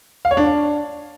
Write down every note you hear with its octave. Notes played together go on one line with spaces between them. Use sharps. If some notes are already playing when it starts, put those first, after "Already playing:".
F5
C#5
D4